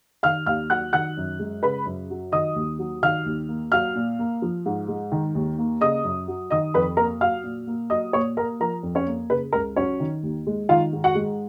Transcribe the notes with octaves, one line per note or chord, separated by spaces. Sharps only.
D#3 F5 F6
D#2 F5 F6
F#3 F#5 F#6
D#3 F#5 F#6
F#2
G#3
C#3 B4 B5
F#2
F#3
D#3 D#5 D#6
D#2
F#3
D#3 F5 F6
D#2
A#3
F#3 F5 F6
A#2
A#3
F3
G#2
G#3
D#3
D#2
A#3
C#3 D#5 D#6
F#2
F#3
D#3 D#5 D#6
F2 B4 B5
A#3 A#4 A#5
F#3 F5 F6
A#2
A#3
F#3 D#5 D#6
A#2 C#5 C#6
A#3 A#4 A#5
F3 A#4 A#5
F2
C#4 C#5
A#3
C#3 B4
C#2 A#4
F#3 C#4 C#5
D#3
D#2
G#3
D#3 F4 F5
G#2
F#4 F#5
G#3